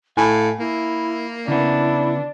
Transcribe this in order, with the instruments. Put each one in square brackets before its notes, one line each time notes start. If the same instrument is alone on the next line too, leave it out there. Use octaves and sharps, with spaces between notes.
[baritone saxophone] A2 [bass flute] F5 [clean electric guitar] G#5
[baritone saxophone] A#3 [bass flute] E4
[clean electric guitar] C#3 B3 [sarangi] D4 [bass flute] E4